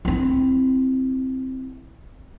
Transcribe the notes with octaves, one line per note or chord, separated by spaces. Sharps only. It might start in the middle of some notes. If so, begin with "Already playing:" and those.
C4 E4